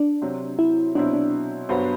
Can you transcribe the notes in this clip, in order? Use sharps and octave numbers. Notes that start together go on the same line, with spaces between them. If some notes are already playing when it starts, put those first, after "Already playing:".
Already playing: D4
C3 F#3 C4
E4
B2 F#3 C4 D4 E4
D4
G2 F#3 B3 F#4 C5